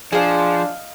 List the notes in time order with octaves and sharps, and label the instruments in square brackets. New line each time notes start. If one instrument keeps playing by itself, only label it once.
[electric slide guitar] F3 [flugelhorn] D4 [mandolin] G#4 C5 [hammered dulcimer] D#5 F5